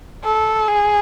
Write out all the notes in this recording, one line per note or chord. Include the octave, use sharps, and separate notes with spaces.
A4
G#4